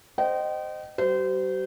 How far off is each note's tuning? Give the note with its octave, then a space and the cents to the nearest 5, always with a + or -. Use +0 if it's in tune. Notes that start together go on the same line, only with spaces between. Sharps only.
C5 -10 D#5 -20 G5 -35
G3 -45 C5 -30